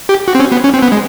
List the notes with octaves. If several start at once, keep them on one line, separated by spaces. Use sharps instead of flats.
G4
F#4
C4
C#4
B3
C#4
C4
B3
G#3